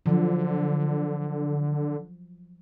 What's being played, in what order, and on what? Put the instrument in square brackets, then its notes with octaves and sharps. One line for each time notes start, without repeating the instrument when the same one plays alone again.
[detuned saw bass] D3 [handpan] F3 F#3